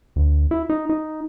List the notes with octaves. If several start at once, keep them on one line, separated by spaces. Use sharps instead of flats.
D2
E4
D#4
D#4